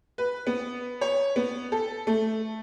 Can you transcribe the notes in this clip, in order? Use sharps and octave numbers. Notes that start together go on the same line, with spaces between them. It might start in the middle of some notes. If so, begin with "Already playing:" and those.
B4
B3
C#5
B3
A4
A3